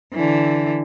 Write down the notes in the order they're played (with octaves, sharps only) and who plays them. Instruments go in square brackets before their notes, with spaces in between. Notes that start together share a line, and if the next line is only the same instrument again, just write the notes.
[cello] D3 E3